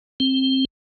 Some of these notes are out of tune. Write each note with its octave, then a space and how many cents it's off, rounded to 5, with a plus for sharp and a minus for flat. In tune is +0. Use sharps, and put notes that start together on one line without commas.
C4 +15